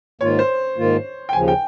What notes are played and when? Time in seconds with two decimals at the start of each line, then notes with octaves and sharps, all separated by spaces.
0.21 G#2 D#3 A#3 F4 C#5
0.39 C5
0.77 G#2 D#3 A#3 F4
1.29 G5
1.33 D#2 C#3 F3 G#5
1.48 G5